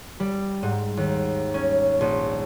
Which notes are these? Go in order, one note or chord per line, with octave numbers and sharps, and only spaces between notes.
G3
G#2
D#2
C#4
A#1